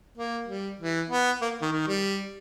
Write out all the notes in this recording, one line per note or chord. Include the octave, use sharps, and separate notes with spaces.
A#3
G3
E3
B3
A#3
D#3
D#3
G3